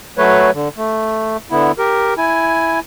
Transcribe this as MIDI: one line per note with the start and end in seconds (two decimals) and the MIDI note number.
0.18 0.51 54
0.18 0.51 57
0.18 0.51 71
0.18 0.51 73
0.54 0.69 50
0.77 1.37 57
1.51 1.72 50
1.51 1.72 59
1.51 1.72 64
1.79 2.14 67
1.79 2.14 70
2.18 2.80 64
2.18 2.80 80